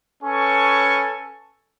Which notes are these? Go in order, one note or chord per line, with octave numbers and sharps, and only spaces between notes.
C#4 A4 B4 G#5 C#6